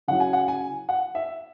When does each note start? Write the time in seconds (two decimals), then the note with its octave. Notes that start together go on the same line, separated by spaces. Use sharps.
0.08 C#3 F#3 E4 F#5
0.20 G#5
0.33 F#5
0.48 G#5
0.89 F#5
1.15 E5